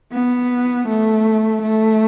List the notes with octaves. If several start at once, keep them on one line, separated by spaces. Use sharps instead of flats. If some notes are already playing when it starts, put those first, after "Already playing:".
B3
A3
A3